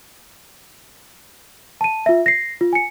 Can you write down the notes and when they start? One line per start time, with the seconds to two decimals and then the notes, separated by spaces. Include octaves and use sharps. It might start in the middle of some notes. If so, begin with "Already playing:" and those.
1.81 A5 D#7
2.06 F4 E5
2.26 A#6 C7
2.61 F4
2.73 G#5 C#7